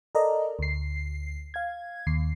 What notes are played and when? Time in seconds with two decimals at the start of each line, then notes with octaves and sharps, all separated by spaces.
0.15 A4 A#4 D5 D#5 A#5
0.59 D2 C7
1.54 F5 G#6
2.07 D#2 C7